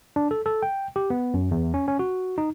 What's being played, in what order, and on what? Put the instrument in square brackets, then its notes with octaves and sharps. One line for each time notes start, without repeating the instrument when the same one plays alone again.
[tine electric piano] D4
A4
A4
G5
G4
B3
F#2
E2
C#4
C#4
F#4
D#4